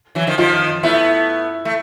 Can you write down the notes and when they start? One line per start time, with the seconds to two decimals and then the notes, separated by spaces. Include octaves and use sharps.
0.15 E3 F#3
0.27 D#3 F3
0.38 D#3 F3 F4
0.83 A3 B3 E4
1.65 A3